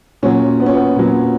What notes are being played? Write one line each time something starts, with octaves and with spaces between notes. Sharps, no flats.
A#2 F#3 C#4
B3
C#4
B3
A#2 F#3